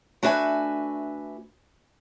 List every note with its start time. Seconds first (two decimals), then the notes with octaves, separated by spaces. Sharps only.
0.23 A3 D4 F#4 B4 E5 G#5